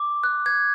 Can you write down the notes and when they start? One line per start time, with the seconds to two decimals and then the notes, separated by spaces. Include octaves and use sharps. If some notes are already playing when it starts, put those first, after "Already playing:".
Already playing: D6
0.24 F#6
0.46 G#6